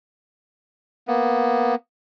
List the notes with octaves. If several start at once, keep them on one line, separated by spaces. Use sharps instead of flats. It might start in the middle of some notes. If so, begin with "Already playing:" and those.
A#3 B3